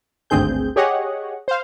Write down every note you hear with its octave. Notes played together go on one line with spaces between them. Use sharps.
G#1 D2 G2 C4 G#4 G6
G4 G#4 C#5 D#5 F#5
C5 F5